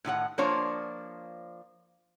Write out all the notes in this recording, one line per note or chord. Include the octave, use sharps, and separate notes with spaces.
A2 D#3 E4 F#5
F3 A#3 D4 F4 C5 C#5